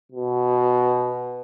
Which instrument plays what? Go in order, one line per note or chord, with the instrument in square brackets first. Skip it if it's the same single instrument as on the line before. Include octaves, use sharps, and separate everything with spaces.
[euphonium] B2